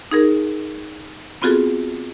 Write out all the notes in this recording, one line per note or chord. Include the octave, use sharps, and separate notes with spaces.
D#4 G#4 A#4
B3 C4 F4 F#4 G#4 A4